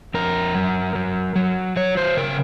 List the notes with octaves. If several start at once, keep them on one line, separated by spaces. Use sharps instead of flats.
F2 A#4
F#3
F#3
F#3
F#3 C#5
C5
C#3 A#4